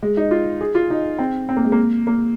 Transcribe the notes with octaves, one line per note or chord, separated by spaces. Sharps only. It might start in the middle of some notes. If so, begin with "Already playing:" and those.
G#3
D#4
F4
G#4
F4
D#4
C4
C4
A#3
G#3
A#3
A#3